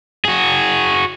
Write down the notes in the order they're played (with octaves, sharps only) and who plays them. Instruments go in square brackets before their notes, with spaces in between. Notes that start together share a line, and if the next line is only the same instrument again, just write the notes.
[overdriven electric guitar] F#4 G#4